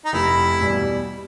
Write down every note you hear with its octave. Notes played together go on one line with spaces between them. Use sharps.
D#4
F1 E4
E2 B2 G3